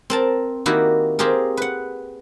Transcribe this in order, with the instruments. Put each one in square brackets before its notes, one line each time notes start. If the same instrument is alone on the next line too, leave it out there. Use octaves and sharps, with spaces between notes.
[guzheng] C4 A#4 A5
D#3 A#3 E4 F#4 G4
C4 F4 G4 G#4 A#4
B4 F#5